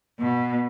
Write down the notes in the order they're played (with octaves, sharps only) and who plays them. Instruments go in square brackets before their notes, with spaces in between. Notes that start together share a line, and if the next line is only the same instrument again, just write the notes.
[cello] B2